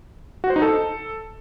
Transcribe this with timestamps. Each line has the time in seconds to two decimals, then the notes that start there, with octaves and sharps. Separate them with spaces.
0.44 F#4
0.50 C5
0.56 D#4
0.62 A4